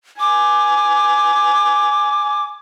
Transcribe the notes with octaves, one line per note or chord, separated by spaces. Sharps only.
G#5 D6